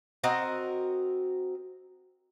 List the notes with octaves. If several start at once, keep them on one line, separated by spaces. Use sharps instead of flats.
C4 F#4 A#4 D#5